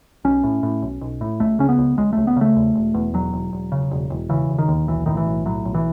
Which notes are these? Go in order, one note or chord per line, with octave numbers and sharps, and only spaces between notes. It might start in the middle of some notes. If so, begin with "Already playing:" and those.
B1 C#4
A2
A2
B1
B1
A2
C#2 A3
C#3 C#4
B3
C#2
C#2 G#3
C#2 A3
B3
C#3 A3
E2
E1
E2
E1 F#3
E1
E1
C#3
E1
E1
C#3 E3
E1
D#3
D#2
B1 E3
A2 D#3
E3
B1
A2 F#3
B1
E3